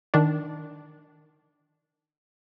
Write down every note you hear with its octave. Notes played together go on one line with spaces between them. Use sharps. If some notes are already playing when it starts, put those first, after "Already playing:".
D#3 D4